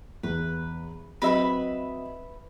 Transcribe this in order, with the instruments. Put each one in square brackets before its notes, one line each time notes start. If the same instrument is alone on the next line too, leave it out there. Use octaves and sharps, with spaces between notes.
[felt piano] E2 [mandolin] B4
[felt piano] F#3 C4 D#5 [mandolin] B4 E5 B5